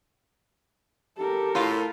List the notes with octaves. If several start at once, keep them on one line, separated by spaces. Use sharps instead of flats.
G4 A4 A#4
A2 F4